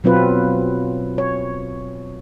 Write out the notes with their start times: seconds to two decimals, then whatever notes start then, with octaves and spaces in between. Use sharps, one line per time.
0.04 B2 F#3 C4 F4 B4
1.18 C#5